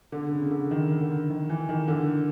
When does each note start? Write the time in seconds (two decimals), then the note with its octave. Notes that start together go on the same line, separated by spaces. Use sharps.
0.12 D3
0.32 C#3
0.43 C#3
0.51 D3
0.71 D#3
1.00 D3
1.30 D#3
1.49 E3
1.69 D#3
1.88 D3